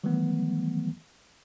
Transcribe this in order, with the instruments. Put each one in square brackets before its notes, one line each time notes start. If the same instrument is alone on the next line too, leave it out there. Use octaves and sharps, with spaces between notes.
[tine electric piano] D#3 E3 F#3 G3 A3 B3